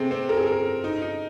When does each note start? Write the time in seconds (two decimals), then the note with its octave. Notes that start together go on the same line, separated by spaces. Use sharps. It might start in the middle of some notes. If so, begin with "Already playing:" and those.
Already playing: C3 C4 G#4 A4
0.11 C4
0.29 A4 A#4
0.37 G#4
0.44 A4 A#4
0.65 A#4
0.84 D#4
1.02 D#4